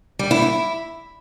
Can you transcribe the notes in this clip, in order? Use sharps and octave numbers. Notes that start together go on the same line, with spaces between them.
G3
E4
E4